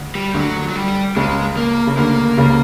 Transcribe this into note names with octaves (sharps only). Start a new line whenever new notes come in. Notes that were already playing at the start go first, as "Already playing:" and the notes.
Already playing: D2
G3
D2 D3 F#3
F#3
G3
C#2 C#3 G#3
A#3
C#3
D2 D3 A#3
C#2 C#3